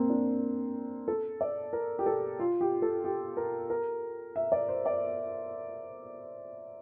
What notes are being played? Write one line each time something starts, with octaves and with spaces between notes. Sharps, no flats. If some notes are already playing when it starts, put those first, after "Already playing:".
Already playing: A#3 C4
D4
A4
D5
A#4
G4
A4
F4
G4
A4
G4
A#4
A#4
E5
D5
C5
D5